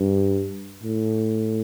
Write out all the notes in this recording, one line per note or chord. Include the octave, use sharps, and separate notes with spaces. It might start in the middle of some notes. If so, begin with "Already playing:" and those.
Already playing: G2
A2